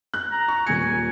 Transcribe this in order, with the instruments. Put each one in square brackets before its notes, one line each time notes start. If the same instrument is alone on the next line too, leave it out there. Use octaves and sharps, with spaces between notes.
[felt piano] F#6
[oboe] A#5
[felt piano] C#6
[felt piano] D#1 A#3 C#7 [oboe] G#5